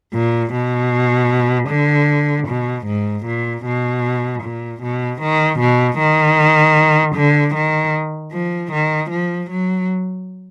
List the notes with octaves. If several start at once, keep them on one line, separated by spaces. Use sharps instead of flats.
A#2
B2
D3
B2
G#2
A#2
B2
A#2
B2
D#3
B2
D#3
D3
D#3
F3
D#3
F3
F#3